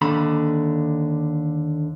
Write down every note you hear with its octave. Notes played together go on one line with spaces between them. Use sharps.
D#2 D3 B5